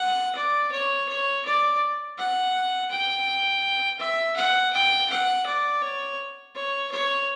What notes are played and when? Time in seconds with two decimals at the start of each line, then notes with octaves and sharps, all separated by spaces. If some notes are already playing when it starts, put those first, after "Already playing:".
Already playing: F#5
0.35 D5
0.72 C#5
1.08 C#5
1.45 D5
2.18 F#5
2.91 G5
3.99 E5
4.36 F#5
4.73 G5
5.10 F#5
5.46 D5
5.82 C#5
6.55 C#5
6.91 C#5